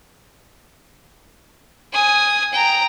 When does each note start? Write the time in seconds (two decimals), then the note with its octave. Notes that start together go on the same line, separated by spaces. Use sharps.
1.93 G#5 D#6
2.53 G5 A#5